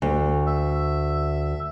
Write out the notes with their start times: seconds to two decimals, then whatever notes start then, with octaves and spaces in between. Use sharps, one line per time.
0.02 D2
0.46 E5